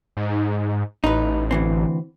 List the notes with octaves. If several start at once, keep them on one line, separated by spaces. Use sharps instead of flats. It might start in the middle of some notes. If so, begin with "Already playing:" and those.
G#2
A1 D#4 B4
D2 E3 C4